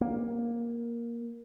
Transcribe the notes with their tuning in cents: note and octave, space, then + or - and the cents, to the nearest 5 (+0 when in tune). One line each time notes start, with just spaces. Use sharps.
A#3 +10